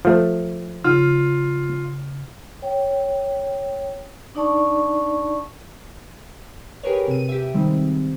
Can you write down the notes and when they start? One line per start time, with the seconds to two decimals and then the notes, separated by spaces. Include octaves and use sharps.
0.05 F3 A3
0.84 C#3 F4
2.62 C#5 G5
4.35 D4 D#4 D5 A5 C#6
6.83 G4 G#4 A#4 B4 C#5
7.08 C3 D#7
7.29 G4 E5
7.54 D#3 G3 G#3 C4